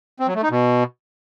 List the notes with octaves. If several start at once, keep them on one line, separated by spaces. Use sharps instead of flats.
C4
F#3
A3
D#4
B2